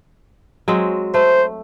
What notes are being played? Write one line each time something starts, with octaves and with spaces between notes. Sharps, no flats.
F#3 G#3 C4
A3 C5